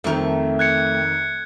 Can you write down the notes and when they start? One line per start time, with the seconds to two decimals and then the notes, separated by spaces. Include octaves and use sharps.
0.04 F2 D#3 A3 C4 A#4
0.59 F#6 G#6 C#7